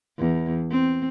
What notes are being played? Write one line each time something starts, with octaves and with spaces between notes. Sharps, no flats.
E2
C4